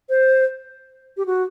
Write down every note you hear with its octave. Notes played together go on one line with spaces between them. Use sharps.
C5
G4
F#4